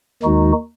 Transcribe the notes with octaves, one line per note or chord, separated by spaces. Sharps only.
D#2 D#3 G#3 D#4 F#4